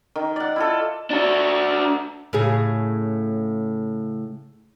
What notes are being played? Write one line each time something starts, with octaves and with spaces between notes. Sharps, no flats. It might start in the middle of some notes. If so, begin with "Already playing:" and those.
D#3
D5 F#5
E4 F4 A4
D4 F#4
A2 C#3 G#4